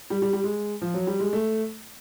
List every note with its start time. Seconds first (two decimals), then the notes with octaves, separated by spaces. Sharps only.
0.10 G3
0.22 G3
0.33 G3
0.44 G#3
0.82 F3
0.94 F#3
1.07 G3
1.20 G#3
1.33 A3